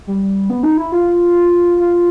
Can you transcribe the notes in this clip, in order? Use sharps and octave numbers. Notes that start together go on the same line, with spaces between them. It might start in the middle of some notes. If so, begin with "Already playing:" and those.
G3
B3
D#4
E4
F4
F4